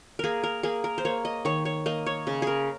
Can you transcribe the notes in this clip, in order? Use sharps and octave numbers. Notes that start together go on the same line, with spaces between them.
A#3 G#4 A#4
A#4
A#3 G#4
A#4
C5
A#3 C#5
D#5
D#3 C#5
C#5
A#3 D#5
C#5
C#3
G#4 A#4